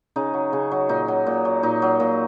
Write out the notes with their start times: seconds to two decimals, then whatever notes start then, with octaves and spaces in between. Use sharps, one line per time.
0.16 C#3 D#4
0.34 F#3
0.53 C#3
0.71 F#3
0.89 A#2 D#4
1.08 F#3
1.27 A#2
1.45 F#3
1.63 A#2 D#4
1.82 F#3
2.00 A#2